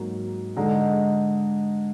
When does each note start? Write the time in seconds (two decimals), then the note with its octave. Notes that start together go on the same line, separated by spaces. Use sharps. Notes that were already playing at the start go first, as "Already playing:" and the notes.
Already playing: G#2 F#3 A#3
0.56 D3 G#3 D#4